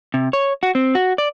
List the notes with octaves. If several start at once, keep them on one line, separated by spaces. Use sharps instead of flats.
C3
C#5
F#4
C4
F#4
D5